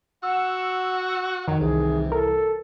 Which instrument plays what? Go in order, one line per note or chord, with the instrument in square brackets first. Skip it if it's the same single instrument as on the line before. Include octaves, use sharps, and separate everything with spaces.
[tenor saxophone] F#4 [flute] F#5 [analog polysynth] E6
[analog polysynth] F2 [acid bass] D#3 [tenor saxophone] F#3
[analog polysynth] C2 E3 [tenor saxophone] C3 [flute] G#4
[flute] A4 [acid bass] A#4